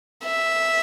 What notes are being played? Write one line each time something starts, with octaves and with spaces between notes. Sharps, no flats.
E5